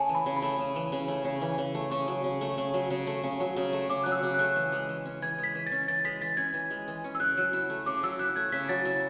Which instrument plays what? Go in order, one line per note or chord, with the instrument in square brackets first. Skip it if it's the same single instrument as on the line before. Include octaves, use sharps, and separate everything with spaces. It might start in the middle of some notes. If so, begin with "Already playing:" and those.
Already playing: [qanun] C#3 A3 [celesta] G#5 A5
[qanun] E3
[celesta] B5
[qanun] C#3
[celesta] B5
[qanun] A3
C#3
E3
C#3
A3
C#3
E3
C#3
A3
[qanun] C#3 [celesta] C#6
[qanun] F#3
C#3
A3
C#3
F#3
C#3
A3
C#3
F#3
C#3
A3
[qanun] C#3 [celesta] D6
[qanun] F#3 [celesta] F#6
[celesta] E6
[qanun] C#3
[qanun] A3 [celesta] F#6
[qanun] E3
G#3
E3
C#4
[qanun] E3 [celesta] G#6
[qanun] G#3
[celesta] B6
[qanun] E3
[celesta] A6
[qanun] C#4
[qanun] E3 [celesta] A6
[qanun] G#3 [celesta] B6
[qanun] E3 [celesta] A6
[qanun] C#4 [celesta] G#6
[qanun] E3
G#3
E3
C#4
[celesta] E6
[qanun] C#3 [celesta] F#6
[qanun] F#3
E4
A3
[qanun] C#3 [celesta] D6
[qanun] F#3 [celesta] E6
[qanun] E4 [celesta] F#6
[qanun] A3 [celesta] G#6
[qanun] C#3 [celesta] B6
[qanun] F#3 [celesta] A6
[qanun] E4 [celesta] A6